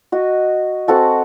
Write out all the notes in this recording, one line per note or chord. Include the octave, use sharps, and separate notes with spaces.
F#4 D#5
C4 F#4 A4 F#5